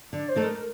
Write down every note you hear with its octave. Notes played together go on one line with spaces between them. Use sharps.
D3 D5
C5
A3 D#4 A4 D5
A#4